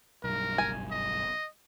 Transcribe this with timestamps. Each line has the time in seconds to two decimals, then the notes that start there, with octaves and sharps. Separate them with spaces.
0.24 B1 G2 A#4
0.58 F#1 G#5
0.91 D#5